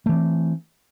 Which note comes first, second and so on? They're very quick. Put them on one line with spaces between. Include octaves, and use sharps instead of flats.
A3 E3 C4